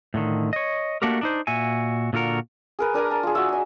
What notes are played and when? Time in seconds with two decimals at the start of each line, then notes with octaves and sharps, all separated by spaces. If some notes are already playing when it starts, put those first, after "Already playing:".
0.14 A2 D3 D#3
0.53 C#5 D#5
1.02 A3 A#3 D4 F#4 G4 A#4
1.21 D4 D#4 C5
1.47 A#2 F#4 E5 G#5
2.13 A#2 D3 F4 F#4 A#4
2.79 G#4 A#4 B4
2.94 D4 A#4 G#5 A#5
3.10 A5 A#5
3.23 F4 G#4
3.35 F#4 E5
3.49 D#5 G#5